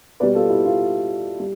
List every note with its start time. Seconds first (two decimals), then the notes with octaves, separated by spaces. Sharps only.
0.20 B2 G3 B4 D5
0.35 F4 A4
0.49 E4 G4
0.65 F4
1.40 G3